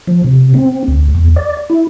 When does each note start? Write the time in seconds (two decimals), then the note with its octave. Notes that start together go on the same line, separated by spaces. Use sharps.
0.07 F3
0.24 C3
0.54 C4
0.88 D2
1.15 E2
1.36 D5
1.70 E4